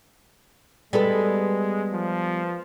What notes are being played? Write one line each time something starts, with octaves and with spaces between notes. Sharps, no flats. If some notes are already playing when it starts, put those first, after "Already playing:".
G3 G#3 B3 A4
F3